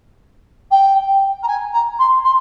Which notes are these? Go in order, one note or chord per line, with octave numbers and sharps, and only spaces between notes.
G5
A#5
G#5
A#5
C6
C6